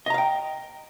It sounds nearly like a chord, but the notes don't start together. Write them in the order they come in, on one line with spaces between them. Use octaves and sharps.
D#5 A#5 F5 G5